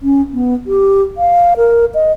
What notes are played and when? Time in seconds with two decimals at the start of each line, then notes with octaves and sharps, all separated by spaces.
0.02 C#4
0.33 B3
0.67 G4
1.18 F5
1.57 A#4
1.94 D#5